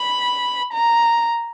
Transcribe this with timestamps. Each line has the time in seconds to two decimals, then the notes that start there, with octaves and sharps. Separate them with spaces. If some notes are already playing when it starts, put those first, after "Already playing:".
Already playing: B5
0.74 A#5